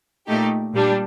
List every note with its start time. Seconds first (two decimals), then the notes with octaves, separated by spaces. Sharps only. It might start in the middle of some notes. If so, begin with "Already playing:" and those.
0.27 A#2 A3 D#4 G4
0.74 A#2 G3 D4